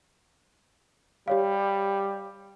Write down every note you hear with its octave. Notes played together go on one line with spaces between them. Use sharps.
G3 G4 C#5 F5